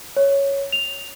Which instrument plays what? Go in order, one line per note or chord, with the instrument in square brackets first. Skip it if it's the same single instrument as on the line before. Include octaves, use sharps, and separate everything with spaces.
[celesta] C#5
F7